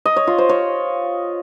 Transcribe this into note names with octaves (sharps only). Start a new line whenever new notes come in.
D#5
C#5
F4
C5
C#5